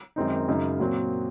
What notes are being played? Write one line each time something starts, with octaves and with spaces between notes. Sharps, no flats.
F#2 D#3 G#3 C4 D#4
F#2 C#3 G#3 D#4
A#2 F#3 C4